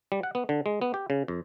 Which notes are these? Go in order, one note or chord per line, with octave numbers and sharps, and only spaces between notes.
G3
F#5
B3
D3
G#3
B3
G4
C#3
F2